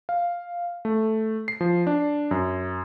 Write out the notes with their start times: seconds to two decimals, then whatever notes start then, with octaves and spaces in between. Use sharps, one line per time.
0.09 F5
0.85 A3
1.48 C7
1.61 F3
1.87 D4
2.31 F#2